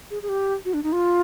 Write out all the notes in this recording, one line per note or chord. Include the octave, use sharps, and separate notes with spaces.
G#4
G#4
G4
F#4
D4
D#4
F4